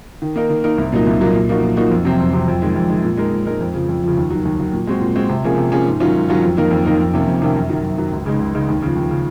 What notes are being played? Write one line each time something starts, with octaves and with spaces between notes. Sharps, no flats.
D#3
A#3 D#4 A#4
D#3
A#3 D#4 A#4
C2
A#2 F#3 A#3 D#4
C2
A#2 F#3 A#3 D#4
A#2
F3 A#3 D#4 F#4
A#2
F3 A#3 D#4 F#4
F2
C3 F#3 C4
F2
C3 F#3 C4
F2
D#3 G#3
F2
D#3 G#3
A#2
G#3 D#4 A#4
A#2
G#3 D#4 A#4
F2
C#3 F3
F2
F3
C#3
D#2
D#3 F#3
D#2
D#3 F#3
A#2
G#3 C4 F#4
A#2
G#3 C4 F#4
C3
F3 A#3 C#4 G#4
C3
F3 A#3 C#4 G#4
G#2
D#3 F#3 C#4 F4
G#2
D#3 F#3 C#4 F4
F2
D#3 A#3 D#4 A#4
F2
D#3 A#3 D#4 A#4
F2
C3 D#3 A#3 C#4
F2
C3 D#3 A#3 C#4
F#2
D#3 F#3
F#2
D#3 F#3
C#2
C#3 G#3 D#4
C#2
C#3 G#3 D#4
D#2
C#3 F3
D#2
C#3 F3